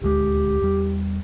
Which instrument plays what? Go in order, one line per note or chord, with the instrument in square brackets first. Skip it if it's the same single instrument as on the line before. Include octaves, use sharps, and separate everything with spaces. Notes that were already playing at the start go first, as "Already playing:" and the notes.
[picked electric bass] D#1 D2 G#3 [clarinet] G4
[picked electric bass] E2 G3